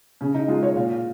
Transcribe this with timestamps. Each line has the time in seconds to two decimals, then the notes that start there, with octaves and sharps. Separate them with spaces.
0.21 C#3 C#4
0.34 D#4
0.48 G#3 F4
0.63 C#5
0.75 A#2 F5
0.91 F5